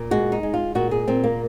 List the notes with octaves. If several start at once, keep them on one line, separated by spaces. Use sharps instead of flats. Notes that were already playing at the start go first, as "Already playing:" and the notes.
Already playing: A#2
G#3 F#4
D#4
G#3
F4
A#2 F#4
G#4
A#2 C4
A#3